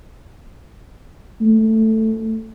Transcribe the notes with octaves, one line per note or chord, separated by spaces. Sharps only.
A3